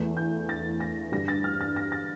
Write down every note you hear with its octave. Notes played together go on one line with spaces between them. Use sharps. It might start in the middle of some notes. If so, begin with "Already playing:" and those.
Already playing: E2 E3 A3
G6
A6
A#6
G2 D3 G3 A#6
A6
F6
A6
A#6
A6